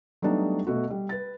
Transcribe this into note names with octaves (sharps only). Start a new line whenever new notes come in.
F#3 G3 A3 B3 D4 D#4
B2 A3 F#4
G3
B4 A6